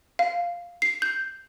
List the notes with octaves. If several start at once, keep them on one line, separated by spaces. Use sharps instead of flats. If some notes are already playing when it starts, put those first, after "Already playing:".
F5
C7
G6